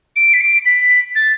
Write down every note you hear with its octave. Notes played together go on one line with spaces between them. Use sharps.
D7
B6
D7
B6
A6